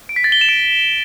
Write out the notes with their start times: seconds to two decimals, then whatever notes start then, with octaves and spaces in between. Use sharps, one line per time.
0.09 D7
0.16 B6
0.24 A6
0.32 G7
0.41 E7
0.49 D7